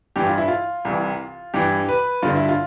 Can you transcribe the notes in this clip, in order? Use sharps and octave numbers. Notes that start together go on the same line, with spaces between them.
G2 E3 G4
F4
E4
F4
C2 C3 E3
G2 E3 G4
B4
G2 D3 F4
E4
F4